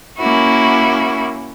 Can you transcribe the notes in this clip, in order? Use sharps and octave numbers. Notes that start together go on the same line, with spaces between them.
A#3 C#4 E4 F#4